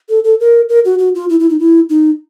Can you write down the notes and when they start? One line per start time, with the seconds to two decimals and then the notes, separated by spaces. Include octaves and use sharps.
0.09 A4
0.24 A4
0.40 A#4
0.69 A#4
0.85 F#4
0.99 F#4
1.15 F4
1.30 E4
1.40 E4
1.50 D#4
1.59 E4
1.89 D#4